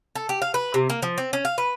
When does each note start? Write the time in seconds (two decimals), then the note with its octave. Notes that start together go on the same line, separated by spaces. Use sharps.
0.16 A4
0.29 G4
0.42 F5
0.54 B4
0.74 C3
0.90 A#3
1.02 F3
1.18 C4
1.33 C#4
1.45 F5
1.58 B4